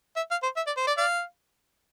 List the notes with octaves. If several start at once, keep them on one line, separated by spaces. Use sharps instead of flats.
E5
F5
C5
E5
D5
C5
D5
D5 F5